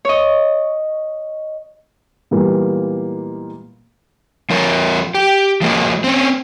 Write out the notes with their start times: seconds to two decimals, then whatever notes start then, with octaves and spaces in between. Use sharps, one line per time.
0.05 C#5 D#5
2.31 A#2 E3 G3 G#3 A#3 B3
4.50 F3 F4 A#4 C#5
5.14 G4
5.62 F3 F#3 G#3 A#3
6.04 C4 C#4